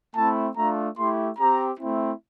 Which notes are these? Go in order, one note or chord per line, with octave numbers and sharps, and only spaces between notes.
A3 C4 E4 A5
A3 D4 F4 A#5
A3 E4 G4 C6
C4 G4 A#5
A3 C4 E4